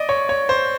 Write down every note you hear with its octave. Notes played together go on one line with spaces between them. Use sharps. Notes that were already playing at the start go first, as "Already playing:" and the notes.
Already playing: D5 D#5
C#5
C#5
C5